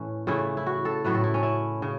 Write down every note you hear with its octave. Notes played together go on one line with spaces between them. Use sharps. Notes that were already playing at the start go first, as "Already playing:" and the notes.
Already playing: A2 E3 A3 C#4
C#3 E3 A3 E4
E4
F#4
A4
A2 F#3 A3 B4
A4
E4
C#4
E4
C#3